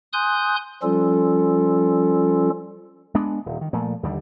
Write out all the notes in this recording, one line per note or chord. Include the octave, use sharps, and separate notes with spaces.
G#5 C6 D#6 F#6 G6
F3 G3 C#4 F4 A4
G#3 B3 D4
D#1
D#3
A#2 F3 A3
D#2 D3 G3